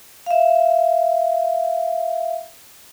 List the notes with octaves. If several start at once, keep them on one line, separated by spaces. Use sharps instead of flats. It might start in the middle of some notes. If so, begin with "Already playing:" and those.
E5 F5